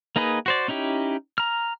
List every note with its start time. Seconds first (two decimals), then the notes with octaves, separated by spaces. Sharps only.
0.16 A#3 D#4 G#4 B4 D#5
0.46 F#4 C5 D5
0.68 C#4 D#4 E4 G4
1.38 A#5 F6